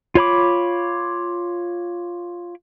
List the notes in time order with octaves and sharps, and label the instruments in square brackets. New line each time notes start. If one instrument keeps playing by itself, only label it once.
[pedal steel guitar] F4 C#5 B5 D6